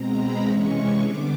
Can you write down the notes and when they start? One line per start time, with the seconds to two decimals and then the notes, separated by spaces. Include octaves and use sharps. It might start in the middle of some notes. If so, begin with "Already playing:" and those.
Already playing: B2 G#3 C4 A#5
0.17 B5
0.45 C3 E3 G#3 C#4 C#6
1.02 D3 G3 B3 D4 D6